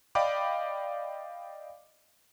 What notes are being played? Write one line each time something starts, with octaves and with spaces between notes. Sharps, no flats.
D5 D#5 F5 G5 B5 D6